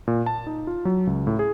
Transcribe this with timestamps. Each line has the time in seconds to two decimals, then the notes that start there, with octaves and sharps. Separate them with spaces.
0.07 A#2
0.26 A5
0.47 D#4
0.67 F4
0.85 F#3
1.07 C#2
1.27 A2
1.39 G#4